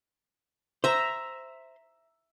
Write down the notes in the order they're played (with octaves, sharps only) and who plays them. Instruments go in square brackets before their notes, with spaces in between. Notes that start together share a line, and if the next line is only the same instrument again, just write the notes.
[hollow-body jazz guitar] C5 [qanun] E5 A#5